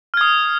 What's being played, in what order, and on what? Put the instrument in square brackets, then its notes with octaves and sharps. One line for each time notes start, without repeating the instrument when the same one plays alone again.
[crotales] F6
G#6
D#6